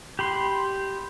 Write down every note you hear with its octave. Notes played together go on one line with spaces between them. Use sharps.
G4 B5 C6